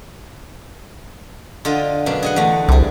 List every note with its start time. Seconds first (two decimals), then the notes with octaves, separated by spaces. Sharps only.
1.65 D3 F4 D#5
2.06 F#2 B2 D4
2.23 G#4 D#5 F#5
2.36 E2 D3 A3
2.68 C2 G3 G#4